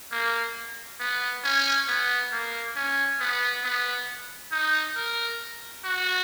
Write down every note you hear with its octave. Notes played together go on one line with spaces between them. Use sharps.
A#3
B3
C#4
B3
A#3
C#4
B3
B3
D#4
A#4
F#4